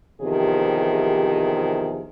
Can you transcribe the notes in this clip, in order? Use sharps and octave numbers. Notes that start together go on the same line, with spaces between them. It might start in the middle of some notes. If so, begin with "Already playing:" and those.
E2 C3 D#3 F3 G4 G#4